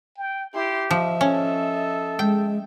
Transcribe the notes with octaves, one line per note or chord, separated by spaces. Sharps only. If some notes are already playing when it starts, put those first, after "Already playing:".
G5
E4 G4 C6
F3 D#5 E5
C#4 A4
G#3 G5